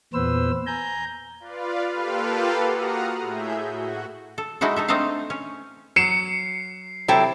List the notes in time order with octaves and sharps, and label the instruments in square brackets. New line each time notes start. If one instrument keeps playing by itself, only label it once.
[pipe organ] E2 A#2 B3 B4 C5 E6
G#5 A#5 G6
[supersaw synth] F4 B4 D5 F5
A#3 F4 G4 A4 B4 F5
F#4 F#5 A#5 D#6 F6
A2 G#4 E5 G6
F#4
[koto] A4
G#3 D#4 E4 F#4 A4
D#4 A4 E5
A3 C4 D4 D#4 A4 F5
C#4
[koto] F#3 [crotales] C7 [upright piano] C#7 E7
[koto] C3 E4 [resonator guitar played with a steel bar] F#3 A4 G5